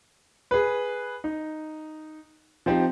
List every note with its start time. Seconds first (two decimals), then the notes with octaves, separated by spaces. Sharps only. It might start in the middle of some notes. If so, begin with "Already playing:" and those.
0.51 G#4 B4
1.24 D#4
2.66 F3 C4 D#4 G4